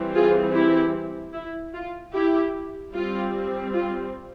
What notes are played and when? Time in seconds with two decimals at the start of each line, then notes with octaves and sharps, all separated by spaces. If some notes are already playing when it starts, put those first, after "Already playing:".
Already playing: E3 G3 C4
0.14 F4 G#4
0.54 E4 G4
1.34 E4
1.74 F4
2.13 E4 G4
2.92 G3 C4 F4
3.73 F4